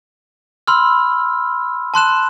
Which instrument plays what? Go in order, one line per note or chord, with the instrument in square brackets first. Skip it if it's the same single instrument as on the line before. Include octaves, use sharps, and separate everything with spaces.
[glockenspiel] B5 C6 E6 F6
A5 C6 F#6 E7